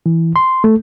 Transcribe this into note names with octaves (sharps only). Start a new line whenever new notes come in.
E3
C6
A3